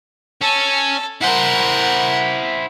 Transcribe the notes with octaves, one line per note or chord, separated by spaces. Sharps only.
C#4 A4
E4 A#4 C5 F#5